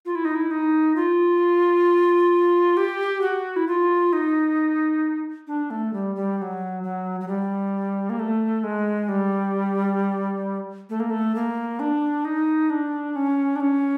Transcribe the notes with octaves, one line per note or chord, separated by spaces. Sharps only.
F4
E4
D#4
E4
D#4
F4
G4
F#4
E4
F4
D#4
D4
A3
G3
G3
G3
F#3
F#3
F#3
G3
A#3
A3
G#3
G3
A3
A#3
A3
A#3
D4
D#4
D4
C#4
D4
C#4